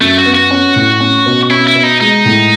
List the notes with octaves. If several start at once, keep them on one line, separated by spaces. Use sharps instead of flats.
F#2 A3
F#4
B3
F#4
C#4
A2
C#4
B2
C#4 E4
E4
B2
D#4
G#3 D#4
A2